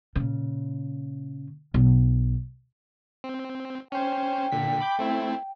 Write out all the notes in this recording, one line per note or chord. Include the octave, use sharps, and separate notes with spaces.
A#2 C#3
B1
C4
C#4 C5 G5
A#2 D3 B6
B5 D6 G6
A3 C4 E4